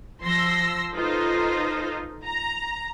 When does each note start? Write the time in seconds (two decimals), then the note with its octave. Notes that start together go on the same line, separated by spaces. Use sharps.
0.22 F3 C6 E6 A#6
0.94 D#4 F4 A4 B4 C5
2.24 A#5